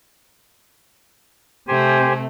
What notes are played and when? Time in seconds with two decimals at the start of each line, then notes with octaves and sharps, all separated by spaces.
1.68 C3 A3 G4 C5 G#5